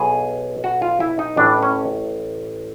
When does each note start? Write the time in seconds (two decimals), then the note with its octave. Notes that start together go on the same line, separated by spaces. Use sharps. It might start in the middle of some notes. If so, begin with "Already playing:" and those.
Already playing: B1 B2 G#4
0.64 F#4
0.82 F4
1.00 E4
1.19 D#4
1.37 A1 A2 E3 D4
1.63 C#4